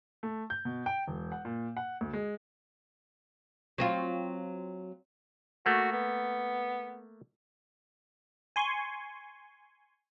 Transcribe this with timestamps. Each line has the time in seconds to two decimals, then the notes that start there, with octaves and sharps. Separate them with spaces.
0.23 A3
0.50 G6
0.65 B2
0.86 G5
1.08 E1
1.32 F#5
1.45 A#2
1.77 F#5
2.01 D2
2.13 G#3
3.78 F#3 C4 F4
5.66 A3 A#3 F#4
5.92 B3
8.56 G#5 C6 C#6